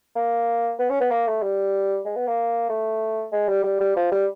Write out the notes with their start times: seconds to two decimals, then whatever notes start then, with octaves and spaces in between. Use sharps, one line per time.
0.16 A#3
0.79 B3
0.90 C#4
1.01 B3
1.11 A#3
1.27 A3
1.43 G3
2.06 G#3
2.16 B3
2.28 A#3
2.69 A3
3.32 G#3
3.49 G3
3.64 G3
3.81 G3
3.97 F3
4.12 G3